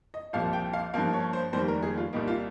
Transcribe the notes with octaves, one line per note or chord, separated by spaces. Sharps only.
D#5
C2 A#2 F3 F5
G5
F5
G2 F3 A#3 F5
C#5
C5
F1 D#2 D#3 G3 A#3 C5
A#4
G#4
F4
C2 A#2 G3 A#3 D#4
F4